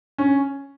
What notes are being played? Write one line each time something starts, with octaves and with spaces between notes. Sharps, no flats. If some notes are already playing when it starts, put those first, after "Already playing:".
C#4